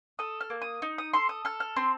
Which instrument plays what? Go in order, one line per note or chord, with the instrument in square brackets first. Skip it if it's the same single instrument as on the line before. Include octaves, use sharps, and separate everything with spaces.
[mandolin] A4 D#6
F6
A#3
D#6
D#4
D#6
A4 C6
D#6
A4 F6
F6
C4 C6